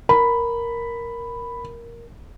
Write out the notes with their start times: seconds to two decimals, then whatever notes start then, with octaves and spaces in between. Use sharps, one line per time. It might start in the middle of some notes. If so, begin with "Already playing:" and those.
0.09 A#4 B5